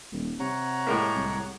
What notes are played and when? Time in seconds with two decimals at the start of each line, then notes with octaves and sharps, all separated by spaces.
0.12 D#1
0.40 C3 C#5 F#5 A#5
0.87 A2 G#3 A#3
1.15 C2